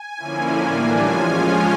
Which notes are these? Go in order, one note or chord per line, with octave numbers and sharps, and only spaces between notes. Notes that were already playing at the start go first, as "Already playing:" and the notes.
Already playing: G#5
D3 F3 A#3 C#4 E4
A2 E3 G3 A#3 D4
F3 G#3 C#4 F4 G#5